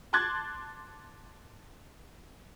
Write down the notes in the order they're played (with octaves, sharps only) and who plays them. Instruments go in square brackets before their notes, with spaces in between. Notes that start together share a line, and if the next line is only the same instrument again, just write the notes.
[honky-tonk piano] A5 C6 D6 F#6 G#6 A6